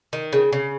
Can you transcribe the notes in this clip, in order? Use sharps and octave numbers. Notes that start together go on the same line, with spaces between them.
D#3
C#3
C#3